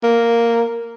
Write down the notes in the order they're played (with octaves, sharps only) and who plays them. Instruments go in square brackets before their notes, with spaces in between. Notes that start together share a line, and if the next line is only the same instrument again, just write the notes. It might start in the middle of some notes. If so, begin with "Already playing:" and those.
[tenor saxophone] A#3